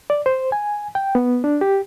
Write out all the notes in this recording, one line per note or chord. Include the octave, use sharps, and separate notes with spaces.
D5
C5
G#5
G5
B3
D4
G4